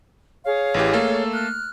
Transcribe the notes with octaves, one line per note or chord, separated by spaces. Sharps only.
G#4 C#5 F5
A1 E3 G4
A3 A#3 A4
F6 F#6